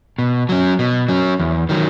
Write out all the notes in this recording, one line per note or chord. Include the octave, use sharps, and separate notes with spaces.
B2
F#3 C#4
B2
F#3 C#4
E2
D#3 F#3